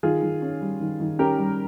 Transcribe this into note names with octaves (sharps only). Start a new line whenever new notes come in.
D#3 F4 G#4
D#3
C#4
G3
D#3
D#3
C#4 G4 A#4
G3